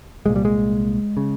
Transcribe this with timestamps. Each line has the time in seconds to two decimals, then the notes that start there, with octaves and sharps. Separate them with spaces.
0.26 C2 A#2 G#3
0.36 G3
0.45 G#3
1.17 C#3